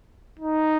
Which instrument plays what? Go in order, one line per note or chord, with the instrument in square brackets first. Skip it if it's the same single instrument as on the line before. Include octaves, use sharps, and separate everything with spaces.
[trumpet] D#4